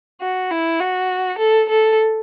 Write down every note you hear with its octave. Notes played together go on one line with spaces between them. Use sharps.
F#4
E4
F#4
A4
A4